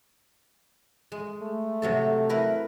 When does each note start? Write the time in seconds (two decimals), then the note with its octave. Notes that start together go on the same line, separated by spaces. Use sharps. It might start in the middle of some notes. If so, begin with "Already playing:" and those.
1.12 G#3
1.43 A3
1.82 C3 F#3 A4
2.29 E4 A#4 B4